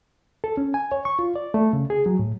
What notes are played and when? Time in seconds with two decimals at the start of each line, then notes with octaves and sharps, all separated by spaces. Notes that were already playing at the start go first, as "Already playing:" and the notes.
0.44 A4
0.57 C#4
0.74 G#5
0.92 C#5
1.05 C#6
1.19 F4
1.36 D5
1.54 A3
1.73 C#3
1.90 G#4
2.06 F#3
2.19 A2